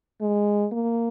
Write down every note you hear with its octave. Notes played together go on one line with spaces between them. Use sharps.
G#3
A#3